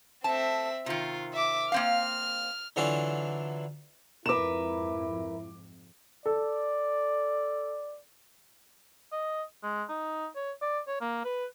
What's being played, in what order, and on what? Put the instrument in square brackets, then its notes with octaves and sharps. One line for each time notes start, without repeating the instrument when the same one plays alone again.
[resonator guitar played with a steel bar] A3 A5 [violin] C4 E5
[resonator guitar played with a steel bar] C3 D#3 [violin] F4
[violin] E5 D6
[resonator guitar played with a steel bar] A#3 C4 F5 [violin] F6
[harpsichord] D3 E3 F#3 D4 E4 F4
[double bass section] F2 G#2 C3 [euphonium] E4 [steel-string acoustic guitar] A#4 B4 [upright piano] D6 E7
[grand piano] A4 [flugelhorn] D5
[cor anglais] D#5
G#3
D#4
C#5
D5
C#5
A#3
B4